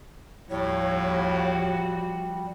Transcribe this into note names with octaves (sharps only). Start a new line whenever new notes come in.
D#2 A2 F3 G3 F#4 C#5